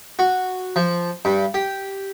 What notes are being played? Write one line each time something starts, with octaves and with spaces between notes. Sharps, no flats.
F#4
F3
G2
G4